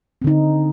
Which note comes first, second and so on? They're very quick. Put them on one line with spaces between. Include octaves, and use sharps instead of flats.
C4 D3 D#4